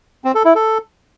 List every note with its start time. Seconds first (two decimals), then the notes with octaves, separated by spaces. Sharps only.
0.25 C4
0.35 A4
0.45 E4
0.55 A4